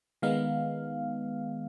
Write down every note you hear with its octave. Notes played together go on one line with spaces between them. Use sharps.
D#3 G#3 B3 D#4 F5